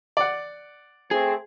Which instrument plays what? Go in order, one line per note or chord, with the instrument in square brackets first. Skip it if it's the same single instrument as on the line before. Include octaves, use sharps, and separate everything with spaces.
[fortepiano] D5 F#5
[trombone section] A3 C4 [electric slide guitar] G#4